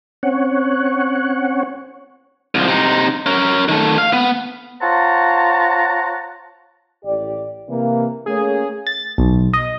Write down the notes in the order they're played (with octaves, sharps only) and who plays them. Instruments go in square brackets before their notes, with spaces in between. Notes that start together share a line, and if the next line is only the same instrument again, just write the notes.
[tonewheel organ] C4 C#4 C#5 F#5
[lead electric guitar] C2 F3
C3 D#4
C#4 A#4
D#3 A3
F5
B3
[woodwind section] F4 C5 C#5 F#5 A5 A#5
[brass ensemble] A1 G4 D5
C3 E3 A#3
[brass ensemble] A3 A#3 C#4 [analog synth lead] G#4
[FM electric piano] A6
B1
D#5